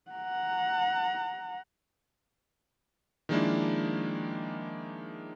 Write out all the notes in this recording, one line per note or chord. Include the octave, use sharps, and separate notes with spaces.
F#5 A#5
D#3 F3 G#3 A#3 D4 E4